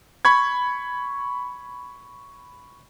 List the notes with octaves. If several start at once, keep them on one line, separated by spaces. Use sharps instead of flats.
B5 C#6 G#6